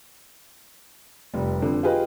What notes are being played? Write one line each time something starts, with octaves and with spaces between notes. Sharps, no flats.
F1 G3
F2 D3
F4 G4 G#4 B4 D#5